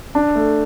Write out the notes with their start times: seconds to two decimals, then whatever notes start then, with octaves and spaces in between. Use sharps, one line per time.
0.15 D4
0.35 A3